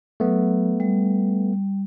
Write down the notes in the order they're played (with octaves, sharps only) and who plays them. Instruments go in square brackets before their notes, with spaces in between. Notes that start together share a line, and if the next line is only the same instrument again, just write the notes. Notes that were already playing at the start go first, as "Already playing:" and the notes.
[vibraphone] F#3 [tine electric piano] A3 B3
[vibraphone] G3